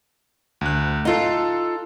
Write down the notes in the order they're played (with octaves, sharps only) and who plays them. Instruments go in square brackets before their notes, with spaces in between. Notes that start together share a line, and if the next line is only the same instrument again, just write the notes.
[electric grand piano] D2 F#6
[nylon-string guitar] D#4 F4 [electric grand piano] A4 F5